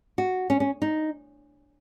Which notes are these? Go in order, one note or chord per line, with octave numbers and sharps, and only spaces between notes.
F#4
C#4
C#4
D#4